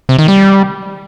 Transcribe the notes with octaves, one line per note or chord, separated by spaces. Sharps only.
C3
D#3
G3